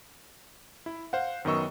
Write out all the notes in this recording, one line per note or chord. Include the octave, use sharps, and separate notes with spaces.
E4
C5 F5 F#5
F#2 D#3 B3 D#5 C#6 E6